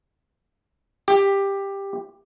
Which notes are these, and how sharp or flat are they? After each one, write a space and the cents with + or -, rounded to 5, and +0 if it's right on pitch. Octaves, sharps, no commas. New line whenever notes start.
G4 +10